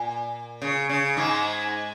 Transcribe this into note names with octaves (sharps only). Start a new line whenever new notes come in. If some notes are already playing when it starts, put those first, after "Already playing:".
Already playing: A#2
C#3
C#3
G#2 G#3